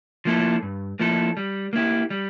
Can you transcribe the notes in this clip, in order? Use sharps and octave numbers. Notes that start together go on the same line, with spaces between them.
F3 A#3 E4 A4
G2
F3 A#3 E4 A4
G3
A#3 E4 G4
G3